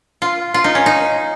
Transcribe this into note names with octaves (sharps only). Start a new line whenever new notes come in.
F4
F4
D#4
C#4
D#4